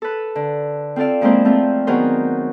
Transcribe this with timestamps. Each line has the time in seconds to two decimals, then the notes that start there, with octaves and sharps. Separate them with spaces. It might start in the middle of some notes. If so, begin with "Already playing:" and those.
0.02 A4 B4
0.35 D3
0.96 C4 F4 A4 D5 F5
1.21 F3 G#3 A#3 C4 E4 C5
1.45 A3 C4 F4
1.87 D#3 F#3 B3 G#4 A#4 C5